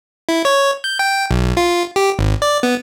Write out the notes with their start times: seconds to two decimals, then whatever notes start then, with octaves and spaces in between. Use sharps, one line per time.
0.29 E4
0.45 C#5
0.84 G6
0.99 G5
1.31 B1
1.57 F4
1.96 G4
2.19 G#1
2.42 D5
2.63 B3